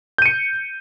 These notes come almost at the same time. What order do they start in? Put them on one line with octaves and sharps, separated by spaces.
G6 D#7 C#7